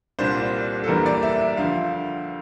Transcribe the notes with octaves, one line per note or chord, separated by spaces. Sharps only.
C2 A#2 G3 D4 C5
A4
E2 E3 G3 A#3 D4 A#4
D5
E5
E5
D2 D3 F3 F5